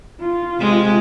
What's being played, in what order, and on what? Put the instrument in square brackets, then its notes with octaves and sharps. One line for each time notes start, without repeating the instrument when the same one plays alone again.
[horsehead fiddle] F4
[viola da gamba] C3 G#3